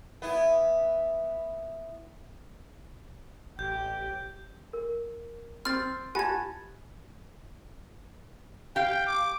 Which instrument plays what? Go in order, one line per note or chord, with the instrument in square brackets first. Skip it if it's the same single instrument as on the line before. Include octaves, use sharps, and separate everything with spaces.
[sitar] B3 E4
[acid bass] A1 [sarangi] G4 [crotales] G6
[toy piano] A#4
[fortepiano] C4 [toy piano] C6 [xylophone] F6 A6
[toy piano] E4 F4 G4 [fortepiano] F#5 A5 [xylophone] G#5 G#6
[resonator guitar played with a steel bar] G4 F5 [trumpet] G5
[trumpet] D6